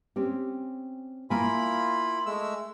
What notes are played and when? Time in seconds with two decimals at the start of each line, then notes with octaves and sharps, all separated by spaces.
0.16 C4 C#4 G4
1.30 A#3 E4 F4 G#5 B5
2.26 G#3 A3 E6